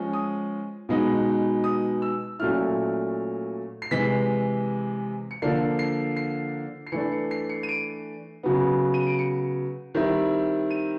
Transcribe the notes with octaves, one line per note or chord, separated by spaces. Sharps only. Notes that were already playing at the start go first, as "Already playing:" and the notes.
Already playing: F3 G#3 C#4
D#6
B2 G#3 B3 D#4
D#6
E6
A#2 F#3 A3 C#4 E4 F6
C7
C3 E3 G#3 B6
C#7
D3 F3 A#3 D4 C7
C7
C7
C7
E3 A3 D4 C#7
C#7
C7
C#7
D#7
D7
C#3 F#3 B3
D#7
D7
C#7
D#3 G3 C4 E4
D#7